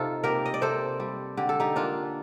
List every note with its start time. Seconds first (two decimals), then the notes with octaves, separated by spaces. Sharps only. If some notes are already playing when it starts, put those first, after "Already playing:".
Already playing: C3 D#4 F4 A4
0.24 A#3 G4 A#4
0.46 D#5
0.54 D5
0.61 C3 A4 C5
1.00 G3
1.37 D3 G4
1.49 A4
1.60 D#4 G4
1.76 A#3 D4 F4